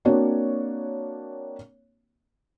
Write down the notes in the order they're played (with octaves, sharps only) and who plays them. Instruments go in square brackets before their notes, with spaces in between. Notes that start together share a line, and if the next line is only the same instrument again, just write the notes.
[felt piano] A#3 C4 D4 F#4 C#5